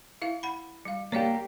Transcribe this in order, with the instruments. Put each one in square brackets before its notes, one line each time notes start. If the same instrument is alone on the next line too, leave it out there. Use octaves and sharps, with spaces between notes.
[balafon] E4 E5 F5
F#5 B5
G3 F5
[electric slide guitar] A#3 G4 [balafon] C#5 D5 F5